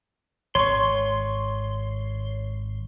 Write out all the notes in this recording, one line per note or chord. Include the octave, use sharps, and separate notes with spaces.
G#1 C#5 C6 C#6